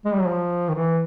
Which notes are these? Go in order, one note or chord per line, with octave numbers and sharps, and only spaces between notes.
G#3
G3
F#3
F3
D#3
E3